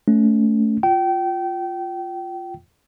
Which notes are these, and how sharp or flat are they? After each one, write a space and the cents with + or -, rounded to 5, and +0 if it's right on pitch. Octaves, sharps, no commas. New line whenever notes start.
A3 +0 C#4 +30
F4 +0 G5 -30